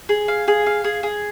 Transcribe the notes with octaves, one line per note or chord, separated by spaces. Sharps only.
G#4
F5
G#4
F5
G#4
G#4